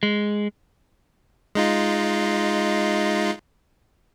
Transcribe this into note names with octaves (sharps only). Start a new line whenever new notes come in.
G#3
G#3 D#4 F4